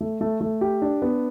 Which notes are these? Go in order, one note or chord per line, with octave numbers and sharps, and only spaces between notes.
A3
A3
A3
G4
D4
B3